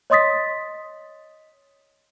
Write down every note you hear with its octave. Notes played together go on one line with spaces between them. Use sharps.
C#5 D#5 C6 D#6 A6 B6